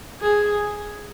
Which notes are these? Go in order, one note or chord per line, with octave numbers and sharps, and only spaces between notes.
G#4